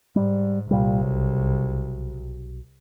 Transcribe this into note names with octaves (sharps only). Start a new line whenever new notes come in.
G#2 G3
C2 A#2 G3
B1